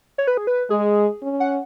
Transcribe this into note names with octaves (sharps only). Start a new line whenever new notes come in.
C#5
B4
G#4
B4
G#3 G#4
C#4
F#5